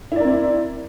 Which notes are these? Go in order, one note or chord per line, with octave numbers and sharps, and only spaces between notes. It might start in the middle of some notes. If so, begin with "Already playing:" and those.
C4 E4 A#4 D5